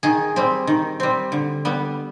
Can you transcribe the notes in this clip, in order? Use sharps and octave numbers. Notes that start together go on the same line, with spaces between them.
D#3 G#4
G3 C4
D#3
G3 C4
D3
G3 B3